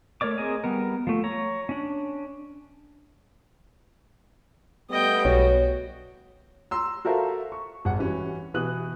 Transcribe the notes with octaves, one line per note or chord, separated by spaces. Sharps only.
A3 A#4 C#5 D5 D6
C4 G#4 A#4 D#5 G#5
G3 B3 A#4
F3 A3
C#5 A#5
C#4 D4
G3 A3 B3 D#5 G5
B1 F#4 C#5
A#5 C6 E6
F#4 A4 A#4 C5 E5 F5
C#6
G#1 F#5
E3 G3 C#4 F#4
B2 E3 D#6 F#6 F#7